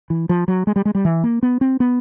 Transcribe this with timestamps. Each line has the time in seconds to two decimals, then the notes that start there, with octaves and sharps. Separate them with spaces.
0.10 E3
0.29 F3
0.48 F#3
0.67 G#3
0.76 G3
0.85 G#3
0.95 G3
1.05 E3
1.24 A#3
1.43 B3
1.61 C4
1.80 B3